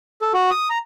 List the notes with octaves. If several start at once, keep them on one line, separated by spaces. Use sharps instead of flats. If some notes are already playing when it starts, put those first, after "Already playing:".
A4
F#4
D#6
A#5